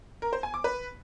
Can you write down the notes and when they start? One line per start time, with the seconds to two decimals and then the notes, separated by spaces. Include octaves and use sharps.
0.22 A#4
0.33 C5
0.43 G#5
0.54 D6
0.64 B4